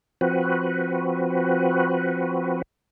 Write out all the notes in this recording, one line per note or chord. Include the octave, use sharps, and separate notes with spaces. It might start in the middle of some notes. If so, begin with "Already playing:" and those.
F3 C4 F#4 B4